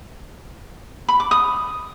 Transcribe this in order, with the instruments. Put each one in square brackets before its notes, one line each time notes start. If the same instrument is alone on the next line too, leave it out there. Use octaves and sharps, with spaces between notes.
[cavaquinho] B5
D6
D#6